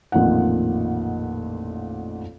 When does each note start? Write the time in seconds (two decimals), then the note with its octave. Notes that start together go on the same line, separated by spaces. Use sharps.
0.12 A1 F2 A#2 D#3 F#5